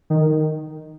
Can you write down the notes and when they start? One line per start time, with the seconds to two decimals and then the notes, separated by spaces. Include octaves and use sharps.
0.10 D#3
0.30 D#3